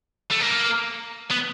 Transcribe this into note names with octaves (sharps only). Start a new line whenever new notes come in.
A3
A#3
B3